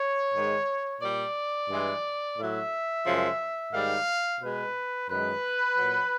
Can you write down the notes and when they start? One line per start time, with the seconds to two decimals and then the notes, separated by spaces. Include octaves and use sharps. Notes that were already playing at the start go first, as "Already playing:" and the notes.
Already playing: C#5
0.33 G#2 D#3 G#3
1.01 A#2 G3 D5
1.69 G2 E3 G#3
2.37 A2 F#3 E5
3.05 F#2 C#3 F3 G#3
3.73 G#2 D#3 G3 F5
4.41 B2 G#3 B4
5.09 F#2 D#3 G#3 B4
5.77 A#2 F#3